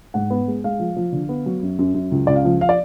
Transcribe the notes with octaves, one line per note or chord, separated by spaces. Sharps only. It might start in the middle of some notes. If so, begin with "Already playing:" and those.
G#2 F#5
B3
G#3
G#3 F5
F3
F3
D3
B3
F#3
F#2
F#2
F#2
C#2
C#2 D5
F5
F3
F5
D5